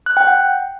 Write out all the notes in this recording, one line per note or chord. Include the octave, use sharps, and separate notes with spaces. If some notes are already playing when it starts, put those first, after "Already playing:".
F#6
G5
F#5